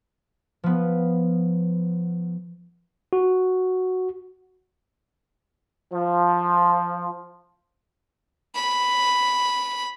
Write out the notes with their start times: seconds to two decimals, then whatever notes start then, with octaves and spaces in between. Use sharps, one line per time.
0.64 F3 B3
3.13 F#4
5.93 F3
8.55 B5